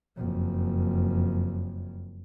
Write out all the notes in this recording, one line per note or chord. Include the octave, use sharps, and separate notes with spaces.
F#1 F2